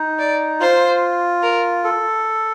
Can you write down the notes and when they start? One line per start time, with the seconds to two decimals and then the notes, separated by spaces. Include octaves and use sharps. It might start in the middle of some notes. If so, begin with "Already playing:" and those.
Already playing: D#4
0.19 D5
0.60 F4 C5
1.43 A#4
1.84 A4